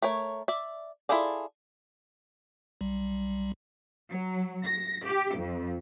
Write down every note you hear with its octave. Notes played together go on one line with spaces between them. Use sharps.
A3 A#4 C#5
D5 E5
E4 F4 G#4 A4 D5
B1 G3
F#3
A#6
G4
F2